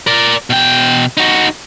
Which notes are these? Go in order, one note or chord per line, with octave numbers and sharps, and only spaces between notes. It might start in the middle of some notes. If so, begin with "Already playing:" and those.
A#4 D5
B2 G5
D#4 F#4